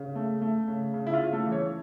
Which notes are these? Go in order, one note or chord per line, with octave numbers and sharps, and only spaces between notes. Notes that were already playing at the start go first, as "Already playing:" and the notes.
Already playing: C#3
A3
A3
C#3
C#3
E4
F4
C#3
A3 A4
E3
C#4 C#5